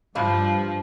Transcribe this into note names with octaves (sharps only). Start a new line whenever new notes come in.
G2 F3 G3 F5